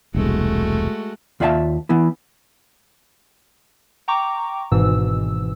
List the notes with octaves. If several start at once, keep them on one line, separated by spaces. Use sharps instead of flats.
E1 C2 G#3 A3 F#4
D#2 F4 D5 E5 F5 A5
E3 B3 E4
G5 A#5 C#6 D6
G#1 G#2 B2 E3 E6